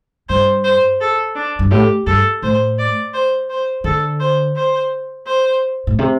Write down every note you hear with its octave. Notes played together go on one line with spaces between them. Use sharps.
G2 C5
C5
A4
D4
G2
A2 G4
G2 A4
A2 C5
D5
C5
C5
D3 A4
C5
C5
C5
A2
C3